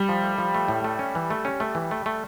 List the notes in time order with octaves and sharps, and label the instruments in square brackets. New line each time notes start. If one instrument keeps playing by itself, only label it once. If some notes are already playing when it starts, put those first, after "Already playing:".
Already playing: [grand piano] G3
[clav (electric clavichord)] F3
A3
F3
A3
A2
A3
C#4
E3
A3
C#4
A3
E3
A3
A3